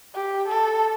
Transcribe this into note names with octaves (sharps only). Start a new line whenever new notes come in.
G4
A4